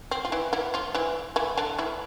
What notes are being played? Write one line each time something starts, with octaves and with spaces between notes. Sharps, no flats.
C4
F4
E3 E4
E3 E4
F3 F4
E3 E4
E3 E4
D3 D4
E3 E4